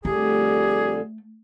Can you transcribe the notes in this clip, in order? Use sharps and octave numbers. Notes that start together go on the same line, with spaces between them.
F2 D3 G3 A3 G4 G#4